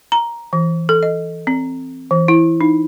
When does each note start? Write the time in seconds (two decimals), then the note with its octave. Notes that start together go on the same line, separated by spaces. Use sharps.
0.12 A#5
0.53 E3
0.89 A4
1.03 D#5
1.47 C4
2.11 E3
2.28 E4
2.61 D#4